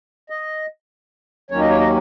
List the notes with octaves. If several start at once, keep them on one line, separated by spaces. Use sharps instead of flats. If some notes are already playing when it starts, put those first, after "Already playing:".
D#5
D#2 D#3 F#3 A#3 C#4 C#5
D#5
C#5
D#5